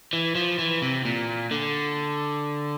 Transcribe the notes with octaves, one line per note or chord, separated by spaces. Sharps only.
E3
F3
E3
C3
A#2
D3